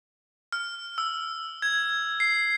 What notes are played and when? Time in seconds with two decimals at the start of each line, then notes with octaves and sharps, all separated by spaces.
0.52 F6
0.98 E6
1.62 G#6
2.20 C7